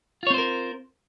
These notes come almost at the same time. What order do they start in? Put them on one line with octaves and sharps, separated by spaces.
F4 C#5 C4 C5 A#4